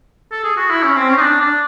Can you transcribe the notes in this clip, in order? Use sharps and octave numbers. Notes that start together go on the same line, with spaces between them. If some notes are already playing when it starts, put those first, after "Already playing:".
A4
G#4
F#4
E4
C#4
C4
C#4
D#4
D4
D4